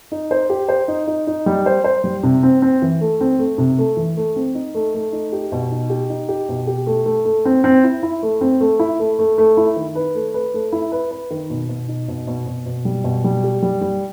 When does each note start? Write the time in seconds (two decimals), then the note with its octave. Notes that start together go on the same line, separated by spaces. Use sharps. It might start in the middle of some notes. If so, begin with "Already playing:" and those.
0.12 D#4
0.31 C5
0.50 G4
0.69 C5
0.88 D#4
1.07 D#4
1.27 D#4
1.46 G3
1.66 C5
1.84 C5
2.04 G3
2.23 C3
2.43 C4
2.62 C4
2.82 E3
3.01 A3
3.21 C4
3.39 A3
3.58 C3
3.78 A3
3.97 E3
4.17 A3
4.36 C4
4.55 D#4
4.75 A3
4.94 A3
5.13 D#4
5.33 G4
5.52 B2
5.71 D#4
5.90 G4
6.10 D#4
6.29 G4
6.49 B2
6.67 G4
6.87 A3
7.06 A3
7.25 A3
7.45 C4
7.64 C4
7.84 E4
8.03 E4
8.23 A3
8.41 C4
8.61 A3
8.79 E4
9.00 A3
9.19 A3
9.38 A3
9.57 E4
9.76 D#3
9.95 B4
10.15 A3
10.34 B4
10.54 A3
10.72 E4
10.92 B4
11.11 B4
11.31 D#3
11.50 B2
11.69 B2
11.88 D#4
12.08 B2
12.27 B2
12.46 B2
12.66 B2
12.85 G3
13.04 B2
13.24 G3
13.44 G4
13.62 G3
13.81 G3